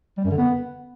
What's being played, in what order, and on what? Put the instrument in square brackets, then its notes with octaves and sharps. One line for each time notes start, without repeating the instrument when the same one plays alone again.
[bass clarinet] G3
F#2
D3
B3